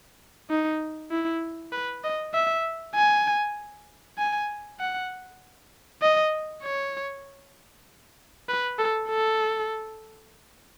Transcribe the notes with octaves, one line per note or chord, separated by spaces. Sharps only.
D#4
E4
B4
D#5
E5
G#5
G#5
F#5
D#5
C#5
B4
A4
A4